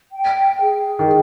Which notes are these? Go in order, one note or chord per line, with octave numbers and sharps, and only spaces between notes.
G5
G#4
D#3
G#4